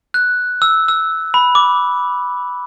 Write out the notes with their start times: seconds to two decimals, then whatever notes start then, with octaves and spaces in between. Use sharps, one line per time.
0.14 F#6
0.62 E6
0.88 E6
1.34 B5
1.55 D6